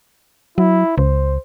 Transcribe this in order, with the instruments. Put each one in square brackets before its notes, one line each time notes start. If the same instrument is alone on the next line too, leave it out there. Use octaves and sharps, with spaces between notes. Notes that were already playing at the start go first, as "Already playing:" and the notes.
[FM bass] F#3 [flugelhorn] E4
[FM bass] C#2 [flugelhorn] C5